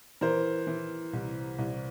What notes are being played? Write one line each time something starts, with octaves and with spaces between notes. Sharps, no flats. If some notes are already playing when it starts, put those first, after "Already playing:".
E3 A#4 C5
E3
C2
C2